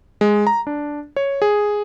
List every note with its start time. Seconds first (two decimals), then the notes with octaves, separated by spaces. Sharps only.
0.21 G#3
0.47 A#5
0.67 D4
1.16 C#5
1.42 G#4